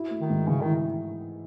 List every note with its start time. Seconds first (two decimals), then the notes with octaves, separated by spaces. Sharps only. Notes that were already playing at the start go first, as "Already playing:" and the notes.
Already playing: E4 F#4
0.11 A3
0.20 D#3
0.30 G#2
0.48 C#3 E3
0.61 D#3 E4